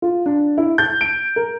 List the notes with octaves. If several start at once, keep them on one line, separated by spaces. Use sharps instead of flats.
F4
D4
E4
G6
D7
A#4